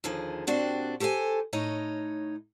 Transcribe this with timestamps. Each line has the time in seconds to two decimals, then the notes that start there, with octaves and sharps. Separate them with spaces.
0.04 D#2 D3 F3 G#4
0.47 A#2 C4 D4 F#4 G4
1.00 G4 A4 C5 C#5 G#5
1.53 A2 D#4 C#5 D#5